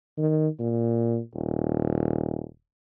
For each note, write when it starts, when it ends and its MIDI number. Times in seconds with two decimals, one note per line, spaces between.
0.18 0.48 51
0.59 1.18 46
1.34 2.43 27